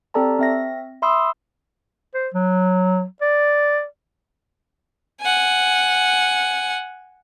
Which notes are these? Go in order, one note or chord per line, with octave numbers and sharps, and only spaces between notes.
C4 G4 A4 D5 A5 A#5
C4 E5 A#6
E5 B5 C6 D#6 E6
C5
F#3
D5
F#5 G#5